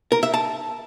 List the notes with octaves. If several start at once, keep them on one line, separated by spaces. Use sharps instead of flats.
A#4
E5
A5